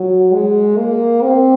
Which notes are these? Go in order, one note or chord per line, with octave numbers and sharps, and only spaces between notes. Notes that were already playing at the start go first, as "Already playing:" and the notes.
Already playing: F#3
G#3
A#3
C4